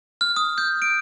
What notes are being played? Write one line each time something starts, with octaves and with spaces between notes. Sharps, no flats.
F6
D#6
G6
D7